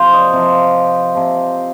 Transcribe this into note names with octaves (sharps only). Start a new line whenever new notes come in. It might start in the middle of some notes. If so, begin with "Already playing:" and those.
Already playing: C3 F3 C5 F5
D#5
C3 F3
C3 F3